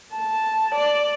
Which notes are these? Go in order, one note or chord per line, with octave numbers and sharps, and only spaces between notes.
A5
D5